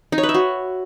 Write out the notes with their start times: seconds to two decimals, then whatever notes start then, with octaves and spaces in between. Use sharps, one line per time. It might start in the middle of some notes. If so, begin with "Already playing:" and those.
0.12 D#4
0.18 C#5
0.23 B4
0.29 E5
0.34 F#4